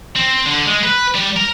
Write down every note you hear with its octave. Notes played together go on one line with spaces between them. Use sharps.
C4
D3
G#3
B4
G3
A#4